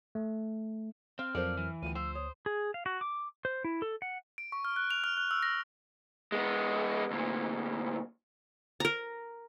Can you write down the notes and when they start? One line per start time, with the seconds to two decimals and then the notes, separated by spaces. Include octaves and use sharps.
0.15 A3
1.19 C4 F5 F6
1.35 F2 F3 F#3 C4 A4 A#4 C5 D5
1.57 E3
1.83 D2 G3 B3 F4 D#7
1.95 F3 C5 E6
2.15 C#5 D#6
2.46 G#4
2.74 F5
2.86 F#4
3.01 D6
3.45 C5
3.64 E4
3.82 A4
4.02 F#5
4.38 D7
4.52 C#6
4.65 F6
4.76 F#6
4.91 F7
5.04 F6
5.17 F#6
5.31 E6
5.43 A#6
6.32 G#3 B3
7.11 D2 A#2
8.80 A#4 A#5